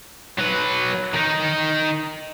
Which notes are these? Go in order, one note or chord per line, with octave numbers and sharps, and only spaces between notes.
F#3 B4
D#3 D#4